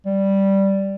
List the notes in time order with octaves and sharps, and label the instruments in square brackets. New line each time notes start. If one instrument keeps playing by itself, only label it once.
[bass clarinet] G3